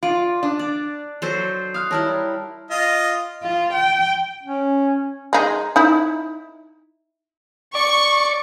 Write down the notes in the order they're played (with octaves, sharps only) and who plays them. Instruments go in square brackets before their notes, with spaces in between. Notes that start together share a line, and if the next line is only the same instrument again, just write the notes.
[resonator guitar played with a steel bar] F4 [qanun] D5 [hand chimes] C6
[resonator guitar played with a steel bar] D4
[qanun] D5
F#3 A4 C5
[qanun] F5 [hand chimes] D#6 F6 F#6
[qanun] G3 E4 A#4 [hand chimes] C#5 A5 F6
[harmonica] F4 D#5
[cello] F4
G5
[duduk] C#4
[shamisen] G#3 D#4
D#4 E4
[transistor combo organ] D5 [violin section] C#6